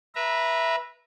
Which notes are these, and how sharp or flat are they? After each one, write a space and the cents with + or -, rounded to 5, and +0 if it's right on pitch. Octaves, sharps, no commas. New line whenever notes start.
B4 -20 E5 +0 A#5 +0